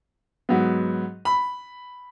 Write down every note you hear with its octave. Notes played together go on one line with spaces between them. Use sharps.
G#2 F#3 B3
B5